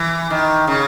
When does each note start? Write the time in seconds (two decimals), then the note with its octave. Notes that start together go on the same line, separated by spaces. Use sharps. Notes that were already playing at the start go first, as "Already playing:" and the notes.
Already playing: E3
0.30 D#3
0.67 C#3